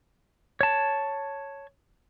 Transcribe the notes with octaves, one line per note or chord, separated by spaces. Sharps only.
C#5 A5